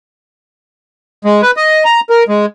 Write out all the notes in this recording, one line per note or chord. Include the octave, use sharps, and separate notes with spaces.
G#3
B4
D#5
A#5
A#4
G#3